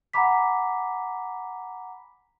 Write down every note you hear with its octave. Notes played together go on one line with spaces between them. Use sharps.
F#5 G#5 A#5 B5 D6 B6